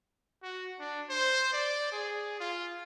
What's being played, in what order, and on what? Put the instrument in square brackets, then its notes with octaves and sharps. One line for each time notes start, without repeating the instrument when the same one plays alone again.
[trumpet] F#4
D4
C5
D5
G#4
F4